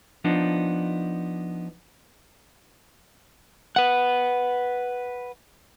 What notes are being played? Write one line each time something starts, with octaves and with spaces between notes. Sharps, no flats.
F3 B3 D4 D#4
B4 F#5